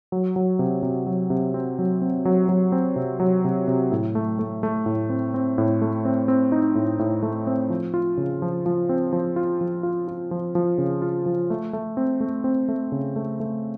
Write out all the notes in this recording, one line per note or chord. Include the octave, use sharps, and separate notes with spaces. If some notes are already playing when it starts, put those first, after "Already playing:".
F#3
F#3
C3
C3
F#3
C3
C4
F#3
C4
F#3
F#3
C4
C3
F#3
C3
C3
A2
A3
A3
A3
A2
C4
C4
A2
A3
C4
C4
D#4
A2
A2
A3
C4
F3
F4
C#3
F3
F3
C4
F3
F4
F3
F4
F4
F3
F3
C#3
F4
F3
A3
A3
C4
A3
C4
A3
C#3
A3
A3